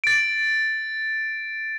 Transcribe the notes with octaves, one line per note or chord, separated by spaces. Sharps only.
A6 D7